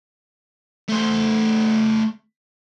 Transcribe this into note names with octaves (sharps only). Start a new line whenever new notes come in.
A3 C5